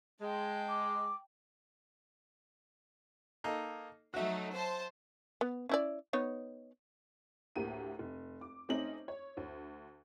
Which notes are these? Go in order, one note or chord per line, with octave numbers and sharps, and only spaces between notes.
G#3 G5 A5
D6
A#3 D#4 A4
F#3 A3 D#4 F#4 E5
C5 A5
B3
C#4 E4 D5
B3 D#4 C#5
D2 A2 A#3 G4 D#7
F1
D6
A3 C4 C#4 D#4 D#5 F#7
C#5
D2